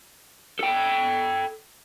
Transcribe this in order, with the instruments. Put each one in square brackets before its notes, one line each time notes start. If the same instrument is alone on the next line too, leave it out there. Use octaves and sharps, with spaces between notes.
[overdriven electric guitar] A4 G5